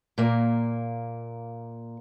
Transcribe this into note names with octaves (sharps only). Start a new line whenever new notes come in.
A#2 A#3